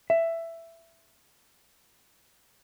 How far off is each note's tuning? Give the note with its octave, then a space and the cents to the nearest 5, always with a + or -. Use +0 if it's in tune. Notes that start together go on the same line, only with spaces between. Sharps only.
E5 +10